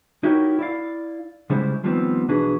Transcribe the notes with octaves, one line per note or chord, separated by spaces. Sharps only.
D#4 E4 F#4 G4 A#4 C#5
E4 D5 F5
C#3 G3 G#3 C#4 E4 C5
D#3 F3 G3 A3 B3 C4
B1 E3 D4 F#4 G#4 B4